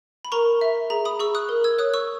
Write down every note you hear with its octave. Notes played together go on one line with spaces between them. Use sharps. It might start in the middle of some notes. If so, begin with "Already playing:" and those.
B5
A#4 A#5 C#6
E5
G#4 A#5
B5 D#6
G#4 C#6 E6
D#6 F#6
A#4
E6 G#6
C#5 D#6 F#6
C#6 E6